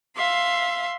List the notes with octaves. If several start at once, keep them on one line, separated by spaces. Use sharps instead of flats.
E5 F5 C6